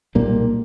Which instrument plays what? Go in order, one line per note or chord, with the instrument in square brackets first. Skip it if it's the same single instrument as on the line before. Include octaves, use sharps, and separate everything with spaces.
[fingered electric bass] B1 A#2 G3 A#3